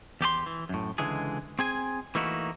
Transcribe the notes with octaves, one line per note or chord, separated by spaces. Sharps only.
E2 G4 G#4 C6
E3
F#2 A2
C#2 D3 E3 G#3 G#4
C4 G#4 G#5
E3 A3 A#3 D#4 E4 F#4